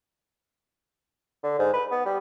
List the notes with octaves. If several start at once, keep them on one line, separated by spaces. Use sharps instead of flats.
D3
G#2
B4
B3
G3